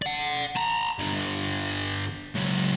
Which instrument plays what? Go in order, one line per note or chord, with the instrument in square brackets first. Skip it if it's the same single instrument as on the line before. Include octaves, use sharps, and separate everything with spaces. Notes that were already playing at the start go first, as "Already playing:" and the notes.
[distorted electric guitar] D5 F#5
A5 A#5
G2 D3
C#2 F#3